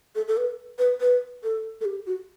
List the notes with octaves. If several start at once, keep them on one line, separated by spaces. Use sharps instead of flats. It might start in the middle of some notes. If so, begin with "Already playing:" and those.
A4
A4
B4
B4
B4
A4
A4
G4
F#4